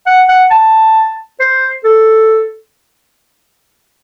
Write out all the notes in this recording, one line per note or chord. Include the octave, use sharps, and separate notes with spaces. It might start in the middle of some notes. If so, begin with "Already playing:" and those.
F#5
F#5
A5
C5
A4